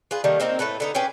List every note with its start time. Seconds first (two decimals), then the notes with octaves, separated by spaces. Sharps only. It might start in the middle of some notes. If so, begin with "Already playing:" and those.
0.11 F4 G#4 B4
0.24 D#3 G3 A3 A#3
0.40 A#3 C4 D#4 A#4
0.59 A2 A3 A4 B4
0.80 D3 B3 D#4
0.95 C#4 G4 G#4 B4